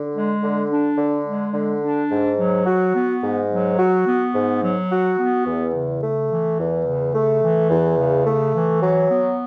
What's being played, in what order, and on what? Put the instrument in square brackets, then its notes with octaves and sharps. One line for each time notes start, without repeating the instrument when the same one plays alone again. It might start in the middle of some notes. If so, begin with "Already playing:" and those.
Already playing: [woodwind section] D3
G#3
D3
D4
D3
G#3
D3
D4
G#2
F#3
F#4
B3
G#2
F#3
F#4
B3
G#2
F#3
F#4
B3
E2
C#3
A3
E3
E2
C#3
A3
E3
E2
C#3
A3
E3
F#3
B3